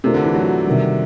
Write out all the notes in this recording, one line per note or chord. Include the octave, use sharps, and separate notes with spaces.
C3 A3 D4 F4 A#4
D3
E3
F#3
C3 D#3 G3